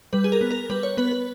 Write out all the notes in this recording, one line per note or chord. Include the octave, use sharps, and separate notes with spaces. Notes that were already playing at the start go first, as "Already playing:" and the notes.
G3 B4
G#4
A#4
B3
A#4
G3 B4
C#5
B3 B4
B4